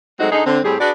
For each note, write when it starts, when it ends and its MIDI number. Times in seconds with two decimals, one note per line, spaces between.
0.20 0.31 54
0.20 0.31 56
0.20 0.31 57
0.20 0.31 60
0.20 0.31 63
0.20 0.31 66
0.32 0.44 50
0.32 0.44 63
0.32 0.44 68
0.46 0.59 50
0.46 0.59 60
0.65 0.76 45
0.65 0.76 55
0.65 0.76 60
0.65 0.76 67
0.65 0.76 68
0.81 0.91 62
0.81 0.91 66
0.81 0.91 68
0.81 0.91 71
0.81 0.91 74